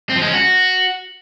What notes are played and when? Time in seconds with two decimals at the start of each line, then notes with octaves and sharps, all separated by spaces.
0.10 C4
0.16 F3
0.22 G#3
0.28 C#4
0.34 F#4